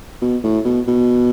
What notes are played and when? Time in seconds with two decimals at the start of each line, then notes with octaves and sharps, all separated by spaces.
0.22 B2
0.44 A2
0.65 B2
0.88 B2